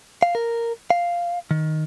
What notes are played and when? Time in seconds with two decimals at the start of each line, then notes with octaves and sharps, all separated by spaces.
0.23 F5
0.35 A#4
0.90 F5
1.51 D#3